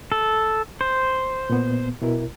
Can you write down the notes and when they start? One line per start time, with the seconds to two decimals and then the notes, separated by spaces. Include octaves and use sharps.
0.12 A4
0.81 C5
1.50 A#2 B3
2.02 B2 E4 A#4